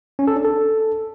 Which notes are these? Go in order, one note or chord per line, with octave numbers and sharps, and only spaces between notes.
C#4
A4
D4
A4